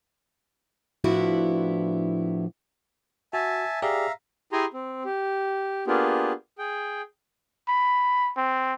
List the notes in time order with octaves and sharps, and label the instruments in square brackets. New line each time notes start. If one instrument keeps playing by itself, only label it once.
[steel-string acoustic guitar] A2 F3 B3 D4 E4 F#4
[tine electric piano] F#4 [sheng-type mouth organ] E5 G#5 A5
[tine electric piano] G4 G#4 D5 [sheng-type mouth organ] E5 F5 A#5
[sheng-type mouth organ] E4 G4 G#4 G#5 A#5 C6
C4
G4
A#3 B3 D4 F4 G4 G#4
G#4 G5
[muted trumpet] B5
C4